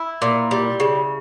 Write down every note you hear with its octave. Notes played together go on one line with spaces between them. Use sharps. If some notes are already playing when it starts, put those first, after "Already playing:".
Already playing: E4
A#2
G3
C#3